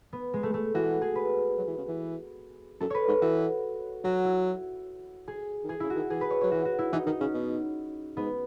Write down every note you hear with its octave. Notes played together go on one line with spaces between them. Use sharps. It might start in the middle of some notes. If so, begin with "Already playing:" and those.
B3
G#3
A3
A3
E3 F#4
G#4
B4
F#3
E3
C#3
E3
F#2 A4
B4 C#5
G#2 C#5
E3 F#4
F#3 F#4
E4
G#4
D#3
E3 G#4
C#3 E4
F#4
D#3
E3 G#4
B4
C#5
F#3 C#5
E3 F#4
F#4
E4
E3 D#4
D#3 D#4
C#3 C#4
B2
G#2 B3